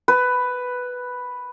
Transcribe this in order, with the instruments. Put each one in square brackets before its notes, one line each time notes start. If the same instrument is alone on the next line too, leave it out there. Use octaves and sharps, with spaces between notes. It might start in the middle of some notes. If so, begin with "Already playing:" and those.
[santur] B4